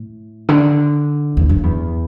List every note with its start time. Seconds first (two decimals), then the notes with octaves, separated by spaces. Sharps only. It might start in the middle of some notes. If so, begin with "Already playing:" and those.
Already playing: A2
0.49 D3
1.37 E2
1.49 F#2
1.63 E2